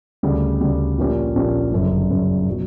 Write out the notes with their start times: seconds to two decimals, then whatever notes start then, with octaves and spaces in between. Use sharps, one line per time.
0.23 D2 C#3 G3
0.61 D2 C#3 G3
0.98 A#1 A#2 A#3 C#4 G4
1.35 A#1 A#2 A#3 C#4 G4
1.72 G1 F#2 C#3
2.10 G1 F#2 C#3
2.49 B2 F#3